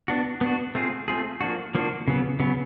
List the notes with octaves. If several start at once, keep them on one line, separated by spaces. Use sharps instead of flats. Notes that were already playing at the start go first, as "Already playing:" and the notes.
B3 D4 F#4
B3 D4 F#4
A3 C4 F4 G#4
A3 C4 F4 G#4
F3 A#3 D4 F#4
F3 A#3 D4 F#4
C#3 F#3 B3
C#3 F#3 B3